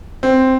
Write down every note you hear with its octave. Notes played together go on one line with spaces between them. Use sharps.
C4